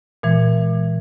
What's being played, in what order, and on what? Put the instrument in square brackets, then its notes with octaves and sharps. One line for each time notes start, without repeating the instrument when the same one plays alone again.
[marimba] A#2 E3 G#3